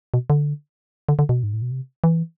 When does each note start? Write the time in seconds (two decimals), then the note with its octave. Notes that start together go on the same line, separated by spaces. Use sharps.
0.14 B2
0.30 D3
1.09 D3
1.19 D3
1.29 B2
1.43 G#2
1.54 A2
1.62 B2
1.71 C3
2.04 E3